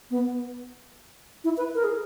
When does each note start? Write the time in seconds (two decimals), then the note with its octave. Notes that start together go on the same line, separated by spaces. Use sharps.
0.11 B3
1.44 E4
1.57 B4
1.75 A#4
1.84 G#4